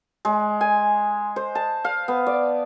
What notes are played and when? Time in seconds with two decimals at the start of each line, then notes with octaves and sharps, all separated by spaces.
0.25 G#3
0.61 G#5
1.36 C5
1.55 A5
1.84 F5
2.08 B3
2.27 D5